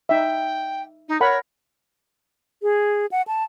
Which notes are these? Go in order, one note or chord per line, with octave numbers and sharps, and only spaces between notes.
D#4 E5 G5
D#4
A#4 C#5 F#5 B5
G#4
F#5
A5